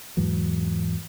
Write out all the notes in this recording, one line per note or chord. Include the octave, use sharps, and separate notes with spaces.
E2 G#2 E3 F#3